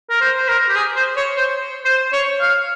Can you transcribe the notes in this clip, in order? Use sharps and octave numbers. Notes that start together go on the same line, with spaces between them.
A#4
C5
C5
A#4
G4
G#4
C5
C#5
C5
C5
C#5
F5